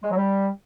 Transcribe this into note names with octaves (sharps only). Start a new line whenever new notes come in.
G#3
F#3
G3